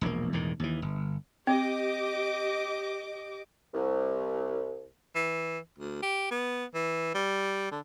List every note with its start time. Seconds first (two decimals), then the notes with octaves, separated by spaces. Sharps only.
0.01 E1 A#1 A2 A#3
0.33 E1 E2 A2 D#3
0.60 D#2 E3
0.82 G1
1.47 C4 G4 D#5 D6
3.74 C2
5.15 E3
5.78 D2
6.02 G4
6.31 B3
6.74 E3
7.14 G3
7.71 D3